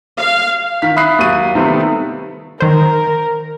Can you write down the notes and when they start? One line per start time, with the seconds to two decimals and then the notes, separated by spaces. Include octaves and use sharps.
0.17 F5
0.82 D#3 F5 B6
0.96 E5 B5 D#6 F#6 C7
1.18 D#2 F#3 D#7
1.55 C3 D#3 G3 A3 B3
2.60 D#3 A#4 C5